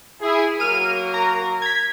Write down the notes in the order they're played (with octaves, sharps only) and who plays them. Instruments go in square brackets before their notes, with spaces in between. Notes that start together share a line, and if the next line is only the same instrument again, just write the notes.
[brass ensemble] E4 G#4
[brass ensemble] F#3 A#3 A#4 [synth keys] F6 D#7
[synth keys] A#5
G#6 B6